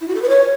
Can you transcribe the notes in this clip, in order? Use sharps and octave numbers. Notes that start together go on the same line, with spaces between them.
E4
F#4
A4
B4
C#5